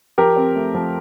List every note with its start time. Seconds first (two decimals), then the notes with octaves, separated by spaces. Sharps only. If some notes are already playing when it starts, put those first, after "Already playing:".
0.18 F3 G4 A#4
0.36 C4
0.56 A3
0.75 F3